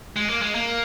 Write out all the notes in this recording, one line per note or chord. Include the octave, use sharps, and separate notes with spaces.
G#3
A#3
G#3
A#3